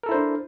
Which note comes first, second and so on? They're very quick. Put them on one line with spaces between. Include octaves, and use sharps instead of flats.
A#4 A4 E4 C5 D4